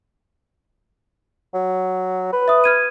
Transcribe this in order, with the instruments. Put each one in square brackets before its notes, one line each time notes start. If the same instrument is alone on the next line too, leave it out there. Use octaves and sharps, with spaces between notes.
[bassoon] F#3
B4
[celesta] E5 D#6
F6 G#6 D#7